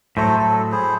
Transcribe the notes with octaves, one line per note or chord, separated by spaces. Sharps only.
A2 F#3 A3 A4 C5
A4
E4 G#4 C5